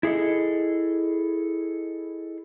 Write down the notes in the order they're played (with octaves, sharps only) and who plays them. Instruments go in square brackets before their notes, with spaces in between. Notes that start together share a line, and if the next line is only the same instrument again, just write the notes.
[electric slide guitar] E4 G#4 A4 D#5